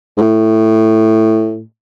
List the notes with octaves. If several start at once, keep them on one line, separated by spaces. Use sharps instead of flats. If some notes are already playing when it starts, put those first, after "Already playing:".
G#2
A2